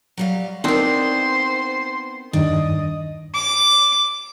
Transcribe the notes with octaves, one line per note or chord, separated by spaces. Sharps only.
F#3 G3 F5
B3 C4 D4 D#4 A#4 C5 C6
E2 G2 D#3 D4 D#5
D6